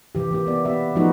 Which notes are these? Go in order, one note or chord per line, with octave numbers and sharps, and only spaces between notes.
C3 E3 G4
E3 A#3 G4
B3 D5
B3 G4 E5
F3 A3 B3 D#4 F#4